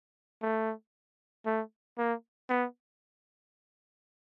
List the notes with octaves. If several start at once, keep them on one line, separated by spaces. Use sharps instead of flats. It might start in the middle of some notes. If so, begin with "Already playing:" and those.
A3
A3
A#3
B3